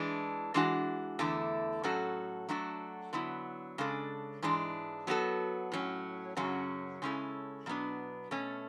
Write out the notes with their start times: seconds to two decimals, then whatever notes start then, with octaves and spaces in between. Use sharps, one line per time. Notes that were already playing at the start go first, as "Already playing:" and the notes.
Already playing: E3 G#3 D4
0.54 E3 G#3 D4 F#4
1.19 E2 D3 A3 E4
1.83 A2 F#3 C#4 F#4 A4
2.49 F#3 A3 D4 F#4 A4
3.13 D3 F#3 B3 E4
3.78 C#3 G#3 D4 A4
4.42 G#2 E3 G#3 D4
5.07 F#3 B3 F#4 A4
5.72 A2 F#3 C#4
6.37 F#2 C#3 F#3 C#4 F#4
7.02 C#3 G#3 C#4 E4 A4
7.66 B2 F#3 B3 D4
8.31 B2 A3 C#4